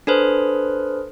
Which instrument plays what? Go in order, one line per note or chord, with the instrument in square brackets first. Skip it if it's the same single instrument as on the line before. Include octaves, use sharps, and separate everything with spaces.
[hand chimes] D4 A4 B4 C5